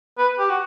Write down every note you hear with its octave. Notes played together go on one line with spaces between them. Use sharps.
B4
G4
F#4